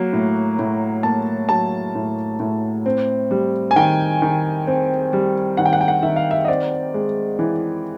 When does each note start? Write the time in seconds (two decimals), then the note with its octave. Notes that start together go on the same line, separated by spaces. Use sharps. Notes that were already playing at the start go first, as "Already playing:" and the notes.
Already playing: F#3 A#3
0.13 A2
0.59 A2
1.03 A#3 A5
1.49 F#3 A5
1.95 A2
2.40 A2
2.86 C4
3.31 G3
3.71 G#5
3.76 D#3 G5
4.22 D#3
4.67 C4
5.13 G3
5.57 D#3 F#5
5.66 G5
5.73 F#5
5.81 G5
5.88 F#5
6.03 D#3 E5
6.16 F5
6.31 E5
6.45 D#5
6.48 C4 D5
6.94 G#3
7.39 E3